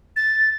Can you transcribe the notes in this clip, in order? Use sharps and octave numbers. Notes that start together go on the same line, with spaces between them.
A6